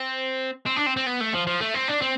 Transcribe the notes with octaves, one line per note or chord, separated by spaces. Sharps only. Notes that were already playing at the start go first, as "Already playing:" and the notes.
Already playing: C4
C4
D4
C4
C4
B3
A3
F3
F3
A3
C4
D4
C4